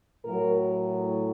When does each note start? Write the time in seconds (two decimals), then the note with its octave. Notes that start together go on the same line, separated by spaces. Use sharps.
0.25 A2 F#3 A#4